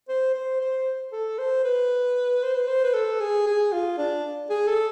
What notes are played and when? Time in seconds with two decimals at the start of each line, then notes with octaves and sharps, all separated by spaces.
0.09 C5
0.34 C5
0.60 C5
1.12 A4
1.38 C5
1.64 B4
2.43 C5
2.55 B4
2.68 C5
2.84 B4
2.94 A4
3.21 G#4
3.46 G#4
3.72 F4
3.98 D4
4.50 G#4
4.67 A4